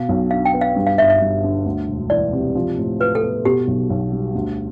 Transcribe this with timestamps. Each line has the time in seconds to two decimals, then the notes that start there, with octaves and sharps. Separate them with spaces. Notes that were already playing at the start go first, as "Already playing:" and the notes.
Already playing: B2 F5
0.09 B1
0.31 D4 F5
0.45 G5
0.54 B3
0.61 F5
0.76 G2
0.87 F5
0.98 G1 E5
1.10 E5
1.21 G1
1.44 D3
1.66 D2
1.88 E1
2.10 E3 D5
2.33 C3
2.55 F3
2.78 A2
3.00 F4 B4
3.15 A4
3.23 B3
3.45 B2 G4
3.67 B1
3.90 B1
4.12 G3
4.35 D2